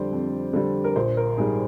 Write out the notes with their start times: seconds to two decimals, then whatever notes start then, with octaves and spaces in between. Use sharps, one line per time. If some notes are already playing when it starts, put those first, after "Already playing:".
Already playing: F2 D3 G3 C5 D5
0.12 F2
0.53 D3 G3
0.84 A#4
0.96 A#1 C5
1.17 A#4
1.37 G#2 G3 G#4